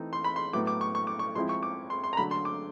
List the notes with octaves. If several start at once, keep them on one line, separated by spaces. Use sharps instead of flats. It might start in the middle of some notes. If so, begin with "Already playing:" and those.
Already playing: E3 A3 C4 D#4
C6
B5
C6
A2 F#3 B3 E4 D6
D6
C#6
C#6
D6
C#6
F3 G#3 C4 E4 C6
C#6
D6
C6
C6
A#5
D3 F#3 A3 B5
C6
D6